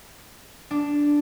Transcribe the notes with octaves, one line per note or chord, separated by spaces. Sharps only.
D4